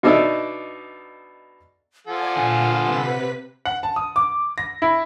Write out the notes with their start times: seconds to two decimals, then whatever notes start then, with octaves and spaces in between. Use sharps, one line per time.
0.03 B2 D4 D#4 A4 D5 E5
2.07 F3 A4 D5 F#5 G#5
2.37 A#2 D3 F5 G#5
2.83 C3 B4 B6
3.65 F#5
3.83 A5
3.96 D#6
4.16 D6
4.58 A#6
4.82 E4